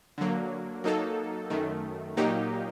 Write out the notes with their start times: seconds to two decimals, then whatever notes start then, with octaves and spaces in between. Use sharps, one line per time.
0.18 D3 F#3 A#3
0.84 F#3 A#3 D#4 A4
1.50 F#2 D#3 A3
2.17 A#2 F#3 A#3 D#4 G4